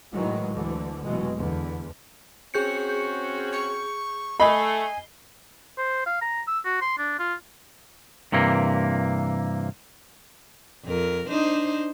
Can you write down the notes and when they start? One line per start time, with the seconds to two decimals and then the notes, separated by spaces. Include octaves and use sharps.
0.13 A2 D#3 E3 F#3 G#3
0.53 D2 D3 E3
1.03 F1 B2 E3 F#3 G#3
1.35 E2 D3
2.54 C4 C#4 F#4 G#4 G6 C#7
3.52 C#6
4.40 A3 D#5 G#5 B5 C7 G7
5.78 C5
6.06 F5
6.22 A#5
6.47 E6
6.65 F#4
6.81 C6
6.98 D4
7.19 F4
8.32 G2 C3 E3 A#3
10.85 F2 A#4
11.29 D4 D#4 C5